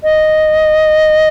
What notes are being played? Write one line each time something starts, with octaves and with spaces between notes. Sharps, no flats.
D#5